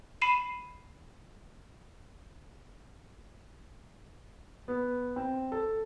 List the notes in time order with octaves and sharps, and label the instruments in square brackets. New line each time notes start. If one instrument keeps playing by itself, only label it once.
[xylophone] B5 C7 D#7 E7
[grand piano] B3
C4
A4